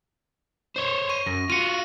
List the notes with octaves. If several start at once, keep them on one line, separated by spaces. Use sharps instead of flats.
C5 C#5
C#6 D#7
F#2 A#6
F4 F#4 C#7 D#7